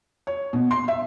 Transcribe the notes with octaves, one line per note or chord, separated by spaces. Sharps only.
C#5
B2
C6
E5